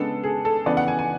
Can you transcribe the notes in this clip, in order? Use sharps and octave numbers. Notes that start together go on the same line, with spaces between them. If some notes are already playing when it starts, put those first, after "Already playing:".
Already playing: C#3 G#3 B3 D4 A4
G#4
A4
C#3 E3 B3 D5
F#5
G#5
G#5